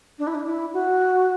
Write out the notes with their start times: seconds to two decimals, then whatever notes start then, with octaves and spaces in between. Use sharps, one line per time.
0.19 D4
0.27 E4
0.35 D4
0.46 E4
0.74 F#4